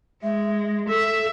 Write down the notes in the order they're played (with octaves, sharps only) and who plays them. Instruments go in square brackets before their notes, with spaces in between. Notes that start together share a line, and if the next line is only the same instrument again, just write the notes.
[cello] G#3 [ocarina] E5
[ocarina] A4 [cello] E5